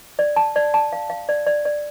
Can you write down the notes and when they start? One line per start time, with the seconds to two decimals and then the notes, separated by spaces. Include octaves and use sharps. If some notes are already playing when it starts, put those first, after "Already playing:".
0.19 D5
0.36 A5
0.56 D5
0.74 A5
0.93 F5
1.10 F5
1.29 D5
1.46 D5
1.65 D5